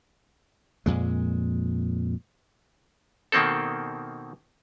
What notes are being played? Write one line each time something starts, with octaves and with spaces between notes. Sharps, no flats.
F2 A#2 G#3
B2 D#3 A#3 C4 A4